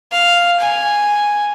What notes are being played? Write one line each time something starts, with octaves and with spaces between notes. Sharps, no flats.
F5
G#5